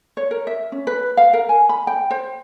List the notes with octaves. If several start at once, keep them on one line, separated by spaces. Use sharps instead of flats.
C#5
A#4
E5
C#4
B4
F5
A#4
G#5
B5
G5
C5